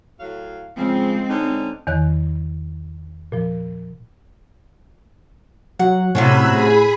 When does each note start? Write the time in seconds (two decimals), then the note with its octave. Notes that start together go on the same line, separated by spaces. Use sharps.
0.20 A2 F#3 F5
0.77 C#3 F3 G#3 C4
1.30 D3 C#4 D#4
1.87 E2 D#3 C#5 F#6
3.32 A#2 F3
5.79 F#3 F#5
6.15 A2 C3 F#3 C#4 B5 E6 F#6
6.52 A2 G#4 B5